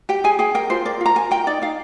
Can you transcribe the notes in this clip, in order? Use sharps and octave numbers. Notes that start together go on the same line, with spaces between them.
G4 G5
G#4 G#5
G#4 G5
A#4 G5
F4 C5
A#4 D5
F4 A#5
A#4 G#5
A#4 G5
D#4 D5
D#4 F5